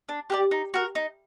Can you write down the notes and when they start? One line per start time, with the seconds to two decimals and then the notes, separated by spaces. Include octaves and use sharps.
0.09 D4
0.30 G4 A#4 D5
0.51 D#4
0.74 F#4 A#4
0.95 D#4